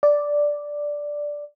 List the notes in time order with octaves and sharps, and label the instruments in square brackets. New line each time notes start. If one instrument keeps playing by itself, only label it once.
[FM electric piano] D5